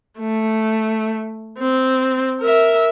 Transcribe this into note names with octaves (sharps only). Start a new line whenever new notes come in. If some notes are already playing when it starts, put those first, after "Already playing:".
A3
C4
A#4 E5